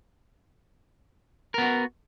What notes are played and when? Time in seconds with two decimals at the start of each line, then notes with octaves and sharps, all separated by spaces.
1.54 A#4
1.58 B3
1.62 F#4